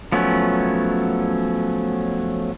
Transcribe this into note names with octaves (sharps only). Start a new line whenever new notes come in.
F3 F#3 A3 B3 C#4